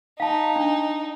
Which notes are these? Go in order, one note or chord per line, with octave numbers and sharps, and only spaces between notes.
D#4 F5 A5
D4